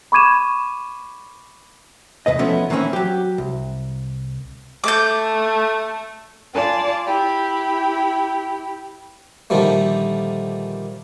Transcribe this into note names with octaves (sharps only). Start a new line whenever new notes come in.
B5 C#6 D6 G#6 D#7 E7
E2 C3 B4 D#5
F3 A3 B3 C#4 E4
D#3 E3 A#3 C4 C#4 E4
F#3 G4
C2
A3 D6 G6
F4 D5 G#5 A5
E4 G4 B5
A#2 D3 D#3 F3 G3 A3